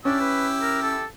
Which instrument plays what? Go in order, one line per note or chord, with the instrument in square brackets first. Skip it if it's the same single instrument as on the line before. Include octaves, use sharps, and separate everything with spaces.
[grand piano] C#4 [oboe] D4 [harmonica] E4 G4 E6
[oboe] B4
A#4
A4